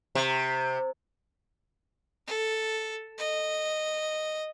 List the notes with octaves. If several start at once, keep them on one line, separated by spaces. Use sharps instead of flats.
C3
A4
D#5